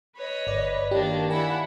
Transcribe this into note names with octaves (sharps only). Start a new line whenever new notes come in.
B4 C#5 D#5
G1 D5
D#3 A#3 D4 G4
E4 F#5 G#5